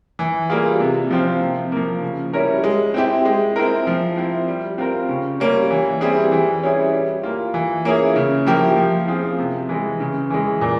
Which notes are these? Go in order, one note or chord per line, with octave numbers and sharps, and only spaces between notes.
E3
G3 A#3 F4 G#4
C3
F3 C4 F4
C3
F3 A#3
C#3
G3 C#4 E4 A#4
G#3
C4 E4 G4
G#3
C4 E4 A#4
F3
C4 E4
G3
C4 F4 A#4
C#3
G3 A#3 C#4
E3
G3 C4 E4 G#4
E3
G3 C#4 E4 G#4
G3
A#3 F4
E3
A#3 C#4 E4 G#4
C#3
F3 A#3 E4 G4
F3
C4 F4 G#4
C3
E3 G#3
C#3
E3 G#3
A#2